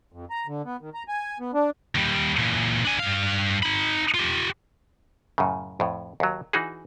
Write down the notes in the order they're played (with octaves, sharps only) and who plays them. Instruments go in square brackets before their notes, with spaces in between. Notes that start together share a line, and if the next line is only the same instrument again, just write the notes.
[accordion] F2
A#5
D3
B3
D#3
A#5
G#5
B3
D4
[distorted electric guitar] D#2 G3
A#2 E3
D4 G#5
G2 F5
D#4 B5
F4 G4
[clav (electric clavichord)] F#2 A2 C#3
F2 A2
D#2 F#3
E3 D#4 F#4 G#4